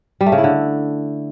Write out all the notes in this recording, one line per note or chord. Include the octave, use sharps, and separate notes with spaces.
G3
A3
C#3
E4
D3